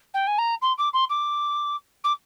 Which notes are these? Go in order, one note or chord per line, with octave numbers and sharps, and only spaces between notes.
G5
G#5
A#5
C6
D6
C6
D6
D6